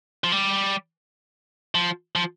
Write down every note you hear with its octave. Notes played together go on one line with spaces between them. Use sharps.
F3
G3
F3
F3